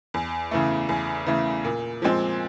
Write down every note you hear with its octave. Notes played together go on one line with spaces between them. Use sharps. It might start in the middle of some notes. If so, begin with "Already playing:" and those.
E2
C#3 E3 A3
E2
C#3 E3 A3
A#2
F3 G#3 C4